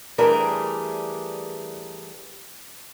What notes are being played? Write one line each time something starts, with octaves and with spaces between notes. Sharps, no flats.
E3 G3 A3 D4 G#4 A#4